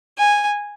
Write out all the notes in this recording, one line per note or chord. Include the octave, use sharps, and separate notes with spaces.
G#5